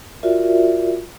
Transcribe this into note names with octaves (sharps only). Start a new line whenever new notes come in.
F4 F#4 A#4 D5 E5